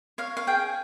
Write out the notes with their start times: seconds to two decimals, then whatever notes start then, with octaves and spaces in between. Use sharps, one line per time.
0.18 C#5 F5
0.37 F5
0.47 G#4 G5